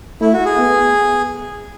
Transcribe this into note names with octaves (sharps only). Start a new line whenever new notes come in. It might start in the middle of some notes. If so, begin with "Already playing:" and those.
A3 E4
F#4
G#4
B3